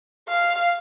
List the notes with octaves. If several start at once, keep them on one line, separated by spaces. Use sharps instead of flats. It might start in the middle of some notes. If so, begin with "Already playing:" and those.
F5